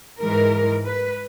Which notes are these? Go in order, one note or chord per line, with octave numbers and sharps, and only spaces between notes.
G#2 E3 G#3 A#4
B4